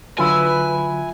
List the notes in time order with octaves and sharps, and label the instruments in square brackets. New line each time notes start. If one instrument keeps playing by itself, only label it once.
[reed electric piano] D3 F#3 F4 [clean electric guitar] E4 [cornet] B4 [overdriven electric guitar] G#5